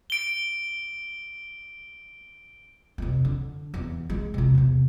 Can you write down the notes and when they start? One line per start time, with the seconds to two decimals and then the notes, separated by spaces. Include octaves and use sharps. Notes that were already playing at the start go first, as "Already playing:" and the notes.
0.10 D7 G7
2.98 F2 C3
3.25 D3
3.74 E2
4.10 G#3
4.34 C3 F4
4.55 E2 C3